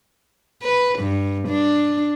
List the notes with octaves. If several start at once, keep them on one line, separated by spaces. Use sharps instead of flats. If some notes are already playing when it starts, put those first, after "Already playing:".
B4
G2
D4